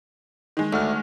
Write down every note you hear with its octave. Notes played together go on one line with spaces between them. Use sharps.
D#3 G#3
D2 A3 F#5 F6